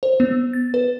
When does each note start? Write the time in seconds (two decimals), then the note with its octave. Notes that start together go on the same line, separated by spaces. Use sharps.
0.03 C5
0.20 B3
0.53 A6
0.74 B4